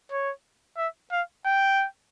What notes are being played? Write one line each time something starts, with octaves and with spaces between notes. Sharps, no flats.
C#5
E5
F5
G5